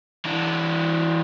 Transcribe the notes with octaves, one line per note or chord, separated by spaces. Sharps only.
E3 D4